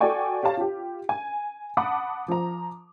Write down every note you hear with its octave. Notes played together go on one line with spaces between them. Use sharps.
F#4 A4 D5 G5 G#5 C#6
G4 C#5 F5 A5
F4 G4
G#5
F#5 A5 B5 D6 D#6
F3 A#5